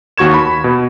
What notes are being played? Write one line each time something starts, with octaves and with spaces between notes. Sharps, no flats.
D#2 F#4 C#6 G#6 E7
B5
B2